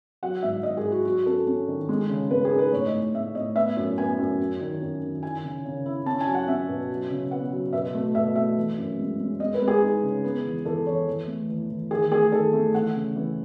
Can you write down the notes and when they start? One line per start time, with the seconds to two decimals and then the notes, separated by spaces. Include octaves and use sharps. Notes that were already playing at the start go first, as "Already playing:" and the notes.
0.23 F#3 F#5
0.43 G#2 E5
0.63 G#2 D#5
0.77 G#4
0.85 E4
0.92 F#4
1.05 F#3 F#4
1.26 C#4 A4
1.47 C#4
1.68 D#3
1.89 G#3
2.09 C#3
2.31 G#3 B4
2.45 G#4
2.51 D#4
2.59 B4
2.73 A2 C#5
2.86 D#5
2.94 A2
3.14 A2 E5
3.35 A2 D#5
3.56 B3 E5
3.77 F#2
3.98 B3 G#5
4.19 F#2
4.40 F#3
4.61 D#3
4.81 F#2
5.02 D#3
5.23 E4 G#5
5.43 C#3
5.65 C#3
5.86 E4
6.06 C#4 A5
6.21 G#5
6.27 F#3
6.35 F#5
6.48 C#4 E5
6.68 B2
6.90 F#3
7.10 C#3
7.31 B3 F#5
7.52 F#3
7.73 B2 E5
7.95 A3
8.15 B2 E5
8.36 A3 E5
8.57 E3
8.78 F#2
8.99 G#3
9.20 G#3
9.40 G#3 D#5
9.54 B4
9.62 G#3
9.68 G#4
9.82 D#4
10.03 C#3
10.24 B3
10.45 E2
10.65 E2 A4
10.86 E2 C#5
11.08 E2
11.27 A3
11.49 E2
11.70 E2
11.91 D#3 G#4
12.11 A3 G#4
12.32 D#3 A4
12.53 A3
12.74 E3 F#5
12.95 C#3
13.16 E3